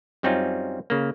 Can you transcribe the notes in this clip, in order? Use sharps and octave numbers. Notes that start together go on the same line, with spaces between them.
F#2 G3 C4 C#4 D#4 F4
C#3 A#3